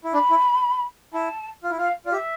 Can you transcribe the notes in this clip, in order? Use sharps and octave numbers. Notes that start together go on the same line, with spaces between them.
E4
D4 B5
E4
E4 A5
F4
E4
F4 F5
F4 D5
G4 E5